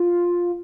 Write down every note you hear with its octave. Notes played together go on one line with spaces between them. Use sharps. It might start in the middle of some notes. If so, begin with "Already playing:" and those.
Already playing: F4